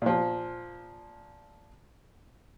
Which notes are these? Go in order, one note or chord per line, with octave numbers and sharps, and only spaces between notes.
A#2 F3